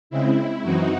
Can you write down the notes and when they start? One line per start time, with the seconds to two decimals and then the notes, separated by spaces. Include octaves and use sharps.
0.10 C#3 G#3 C4 E4
0.63 F#2 E3 C4 D#4 F#4